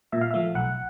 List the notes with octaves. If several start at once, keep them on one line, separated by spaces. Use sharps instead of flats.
A#2 E5
F5
F3 A3 E5
B1 F#5